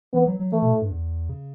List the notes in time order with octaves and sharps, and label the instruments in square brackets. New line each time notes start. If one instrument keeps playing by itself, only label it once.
[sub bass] E3 [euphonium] B3
[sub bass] F#3
F#3
[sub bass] E3 [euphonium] A3
[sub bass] B2
A2
G2
E2
C#3